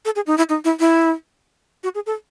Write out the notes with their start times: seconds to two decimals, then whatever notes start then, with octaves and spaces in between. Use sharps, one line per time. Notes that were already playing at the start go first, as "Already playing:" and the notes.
0.05 A4
0.16 G#4
0.27 D#4
0.37 E4
0.49 D#4
0.64 E4
0.80 E4
1.83 F#4
1.95 G#4
2.06 A4